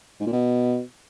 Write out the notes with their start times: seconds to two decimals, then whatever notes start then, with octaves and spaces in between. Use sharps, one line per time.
0.20 G#2
0.26 A#2
0.32 B2